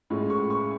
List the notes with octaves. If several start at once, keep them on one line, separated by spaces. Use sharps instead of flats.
A2 G#3 C#4 F4
C#6
C#6